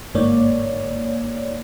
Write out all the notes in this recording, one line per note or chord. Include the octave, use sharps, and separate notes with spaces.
G1 G#2 A#3 C#5 D5